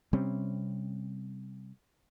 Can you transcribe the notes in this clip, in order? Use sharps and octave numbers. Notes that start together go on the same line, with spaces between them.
C3 G3 C4 C#4